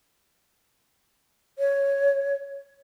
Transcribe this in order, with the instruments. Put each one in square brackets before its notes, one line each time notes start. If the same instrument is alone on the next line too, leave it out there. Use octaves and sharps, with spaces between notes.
[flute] C#5